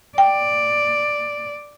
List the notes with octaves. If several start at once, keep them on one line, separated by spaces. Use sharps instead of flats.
D5 G5